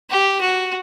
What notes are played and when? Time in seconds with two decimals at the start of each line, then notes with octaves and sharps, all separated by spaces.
0.10 G4
0.41 F#4